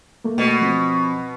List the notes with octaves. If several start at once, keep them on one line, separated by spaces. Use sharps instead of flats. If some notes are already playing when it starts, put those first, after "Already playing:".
A3 A#3
B2
F3 C4